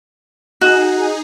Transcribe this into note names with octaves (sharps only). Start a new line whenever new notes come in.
D#4 F#4 G#4